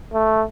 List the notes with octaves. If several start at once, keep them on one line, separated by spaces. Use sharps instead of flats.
A3